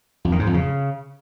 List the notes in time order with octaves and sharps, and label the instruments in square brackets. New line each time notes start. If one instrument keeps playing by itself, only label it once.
[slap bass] F2
D#3
G#2
F2
C#3